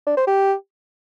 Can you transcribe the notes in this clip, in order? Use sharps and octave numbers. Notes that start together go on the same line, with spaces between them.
D4
C5
G4